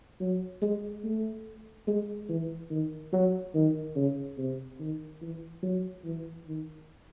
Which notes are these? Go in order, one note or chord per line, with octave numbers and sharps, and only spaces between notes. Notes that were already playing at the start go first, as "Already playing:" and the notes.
F#3
G#3
A3
G#3
E3
D#3
F#3
D#3
C#3
C3
D#3
E3
F#3
E3
D#3